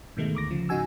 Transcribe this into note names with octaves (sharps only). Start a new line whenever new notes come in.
G#2 B2 D#3 G#3 A3
D2 D6 A#6
C#3 F3
G#2 C#3 D#4 F#4 G#5 E6